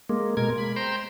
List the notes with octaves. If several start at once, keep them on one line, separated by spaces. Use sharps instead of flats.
G#3 A#3
B2 G#3 A#4 G#6
B5
C5 G5 A#5 C6